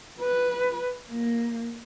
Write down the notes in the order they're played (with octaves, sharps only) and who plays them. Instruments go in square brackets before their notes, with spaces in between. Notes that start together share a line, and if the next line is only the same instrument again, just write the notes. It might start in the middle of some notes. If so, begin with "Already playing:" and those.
[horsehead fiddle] B4
A#3